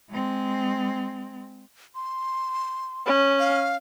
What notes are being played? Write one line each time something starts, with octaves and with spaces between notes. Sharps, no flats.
G#3 C4
C6
C#4
F5